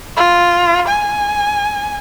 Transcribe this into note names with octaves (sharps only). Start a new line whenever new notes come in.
F4
G#5